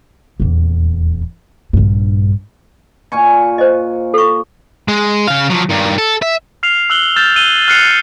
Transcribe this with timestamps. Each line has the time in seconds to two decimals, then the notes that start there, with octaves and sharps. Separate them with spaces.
0.40 D#1 E2
1.73 A#1 G2
3.12 A#2 G#5 C#6
3.58 C5 D#5
4.14 A4 C#6
4.88 G#3
5.27 C#3 F5
5.50 F3 F#3
5.70 G2 D#3
5.98 A4
6.22 E5
6.63 F6 C7 F7
6.90 E6 F#6 F#7 G7
7.16 E6 F6 G6 A6 E7
7.36 E6 D#7 G7
7.68 F6 F#6 C7 C#7 E7 F7